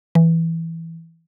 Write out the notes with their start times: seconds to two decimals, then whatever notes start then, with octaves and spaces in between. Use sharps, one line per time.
0.15 E3